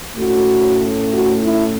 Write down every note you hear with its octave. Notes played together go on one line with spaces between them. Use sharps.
A2 A3 C#4 F#4
F#4
E4